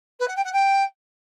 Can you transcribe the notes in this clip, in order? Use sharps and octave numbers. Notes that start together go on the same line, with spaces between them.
B4
F#5
G5
F#5
G5